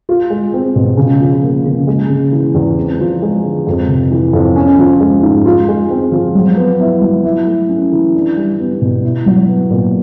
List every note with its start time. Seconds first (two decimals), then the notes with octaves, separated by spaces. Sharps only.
0.09 F4
0.30 G#3
0.54 C4
0.76 B2
0.97 C#3
1.20 F3
1.43 A#3
1.65 C#3
1.87 G#3
2.09 C#3
2.32 E3
2.54 E2
2.77 C4
2.99 F3
3.22 G#3
3.43 D3
3.67 F2
3.88 C3
4.11 E3
4.33 F2
4.56 C#4
4.78 F3
5.00 G#3
5.23 G#2
5.46 F4
5.68 G#3
5.90 C4
6.12 F3
6.35 F#3
6.57 B3
6.80 E4
7.02 F#3
7.24 E4
7.46 A3
7.69 C#4
7.92 E3
8.15 D4
8.36 G3
8.59 B3
8.82 B2
9.04 E4
9.26 F#3
9.49 B3
9.70 A#2